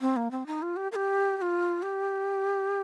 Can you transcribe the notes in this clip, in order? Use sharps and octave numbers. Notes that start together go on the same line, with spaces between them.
C4
A#3
C4
D#4
F4
G4
A#4
G4
G4
F4
G4